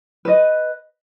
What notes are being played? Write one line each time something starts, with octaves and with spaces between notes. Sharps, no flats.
B4 D#5